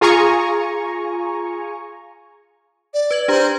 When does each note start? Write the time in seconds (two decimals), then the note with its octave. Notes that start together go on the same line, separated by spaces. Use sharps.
0.01 F4 G#4 G#5 A#5 C#6
2.94 D5
3.11 B4 G#6 F#7
3.28 D4 G4 C5 A#5